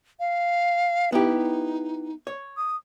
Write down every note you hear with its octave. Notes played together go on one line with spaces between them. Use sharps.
F5
B3 D#4 E4 G4
C#5
D#6